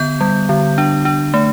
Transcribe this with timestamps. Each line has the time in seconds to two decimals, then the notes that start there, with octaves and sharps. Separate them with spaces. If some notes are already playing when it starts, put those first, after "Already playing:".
Already playing: D3 B3 G6
0.21 G3
0.49 D3
0.78 D4
1.05 D4
1.34 A3